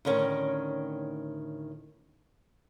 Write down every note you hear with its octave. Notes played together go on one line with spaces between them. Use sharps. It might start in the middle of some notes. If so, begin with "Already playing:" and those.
D2 A2 D#3 C#4 G5